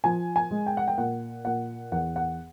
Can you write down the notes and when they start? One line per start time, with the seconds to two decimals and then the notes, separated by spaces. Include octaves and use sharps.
0.04 F3 G#5
0.36 G#5
0.51 G#3
0.66 G5
0.77 F#5
0.88 G5
0.98 A#2 F#5
1.45 A#2 F#5
1.92 E2 F#5
2.16 F#5